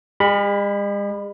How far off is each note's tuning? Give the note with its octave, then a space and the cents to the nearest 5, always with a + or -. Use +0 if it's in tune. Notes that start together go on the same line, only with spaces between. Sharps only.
G#3 -45 B5 +0